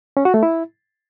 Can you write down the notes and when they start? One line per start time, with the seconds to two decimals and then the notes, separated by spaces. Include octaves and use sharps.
0.17 C#4
0.25 F#4
0.34 A3
0.43 E4